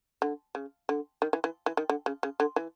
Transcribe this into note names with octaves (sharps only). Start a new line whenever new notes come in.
D3
C#3
D3
D#3
E3
E3
E3
D#3
D3
C#3
C#3
D3
E3